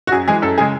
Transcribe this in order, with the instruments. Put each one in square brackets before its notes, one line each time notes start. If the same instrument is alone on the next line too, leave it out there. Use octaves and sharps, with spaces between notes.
[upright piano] F#4
F#2 G#4
E3 G#3 G#4
F#2 A4
C#3 G#3 G#4